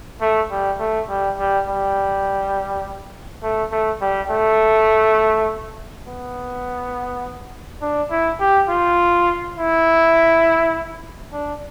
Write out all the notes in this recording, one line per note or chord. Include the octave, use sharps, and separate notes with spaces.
A3
G3
A3
G3
G3
G3
A3
A3
G3
A3
B3
D4
E4
G4
F4
E4
D4